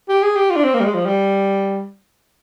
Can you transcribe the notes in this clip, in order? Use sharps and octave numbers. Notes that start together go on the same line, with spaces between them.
G4
G#4
G4
F4
D4
C4
A#3
G3
G#3
F3
G3